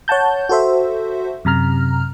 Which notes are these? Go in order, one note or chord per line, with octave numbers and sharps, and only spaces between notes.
C#5 F#5 A5 G6
F#4 A4 C5 E5
F#2 C3 A#5 F6